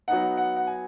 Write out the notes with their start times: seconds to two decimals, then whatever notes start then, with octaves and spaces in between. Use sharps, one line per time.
0.08 F#3 B3 D#4 F#5
0.37 F#5
0.56 F#5
0.67 G#5